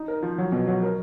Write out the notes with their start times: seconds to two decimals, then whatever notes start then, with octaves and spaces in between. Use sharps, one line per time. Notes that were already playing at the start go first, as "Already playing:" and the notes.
Already playing: D#4
0.08 A#4
0.23 F3
0.38 F#3
0.52 B2
0.67 F#3
0.83 A#4